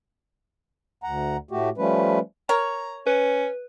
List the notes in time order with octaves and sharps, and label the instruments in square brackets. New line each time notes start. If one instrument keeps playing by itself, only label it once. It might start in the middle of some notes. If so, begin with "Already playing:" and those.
[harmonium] D2 F#5 A#5
A2 A3 F#4 G4
F3 G3 A3 C#4 B4
[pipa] A#4 C#5 [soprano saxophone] A#5
[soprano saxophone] C#4 [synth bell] B4